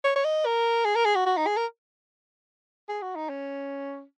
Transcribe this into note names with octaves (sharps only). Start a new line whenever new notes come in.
C#5
C#5
D#5
A#4
G#4
A#4
G#4
F#4
F#4
D#4
G#4
A#4
G#4
F#4
D#4
C#4